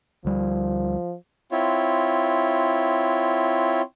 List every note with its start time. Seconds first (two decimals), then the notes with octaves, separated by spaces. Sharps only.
0.25 D2 F3 G3
1.52 C4 E4 F4 C#5